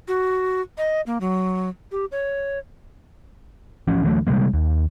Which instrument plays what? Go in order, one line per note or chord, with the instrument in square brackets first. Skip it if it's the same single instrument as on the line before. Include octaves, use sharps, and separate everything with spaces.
[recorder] F#4
D#5
A#3
F#3
G4
C#5
[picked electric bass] A1 F3 C#4
D2 E3 F#3 A3
C3 G3 G#3 A#3
D#2